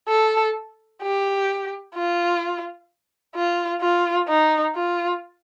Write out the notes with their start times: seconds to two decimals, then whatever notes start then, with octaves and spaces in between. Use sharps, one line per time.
0.08 A4
1.02 G4
1.95 F4
3.35 F4
3.81 F4
4.28 D#4
4.75 F4